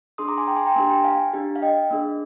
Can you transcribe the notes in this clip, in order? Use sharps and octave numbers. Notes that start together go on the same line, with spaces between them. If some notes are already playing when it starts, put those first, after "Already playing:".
D4 G#4 C6 D#6
A#5 D6
G#5 C6
G5 A#5
G#5 C6
G5 A#5
A#3 D4 G4 G#5 C6
G5 A#5
F5 G#5
D4 G4
F5
D#5 G5
A#3 D4 G#4